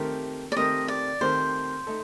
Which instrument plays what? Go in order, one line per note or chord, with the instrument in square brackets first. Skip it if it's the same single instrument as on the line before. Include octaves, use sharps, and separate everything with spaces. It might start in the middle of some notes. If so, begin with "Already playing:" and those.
Already playing: [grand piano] D#3 A3 C4 G4 A#4
[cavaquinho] D5
[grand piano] D#3 A3 C4 G4 A#4 [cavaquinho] D#5
[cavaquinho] D5
[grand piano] D#3 A3 C4 G4 A#4 [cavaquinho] C5
[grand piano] A3 D#4 A4